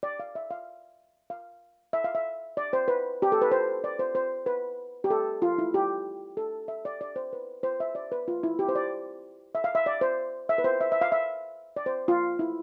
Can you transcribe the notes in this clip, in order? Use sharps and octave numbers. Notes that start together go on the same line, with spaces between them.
D5
F5
E5
F5
F5
E5
F5
E5
D5
C5
B4
G4
A4
B4
C5
D5
C5
C5
B4
G4
A4
F4
E4
G4
A4
E5
D5
D5
C5
B4
C5
E5
D5
B4
F4
E4
G4
C5
D5
E5
F5
E5
D5
C5
E5
B4
C5
E5
E5
F5
E5
D5
C5
F4
E4